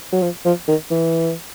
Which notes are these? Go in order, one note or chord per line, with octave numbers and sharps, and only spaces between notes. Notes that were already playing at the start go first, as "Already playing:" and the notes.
F#3
F3
F3
D#3
E3